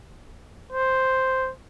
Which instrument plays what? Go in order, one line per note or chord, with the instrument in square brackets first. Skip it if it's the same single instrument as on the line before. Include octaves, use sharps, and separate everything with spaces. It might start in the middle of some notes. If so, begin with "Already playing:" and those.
[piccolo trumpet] C5